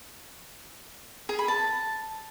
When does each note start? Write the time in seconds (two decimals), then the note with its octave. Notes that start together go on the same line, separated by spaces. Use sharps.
1.29 G#4
1.39 B5
1.48 A5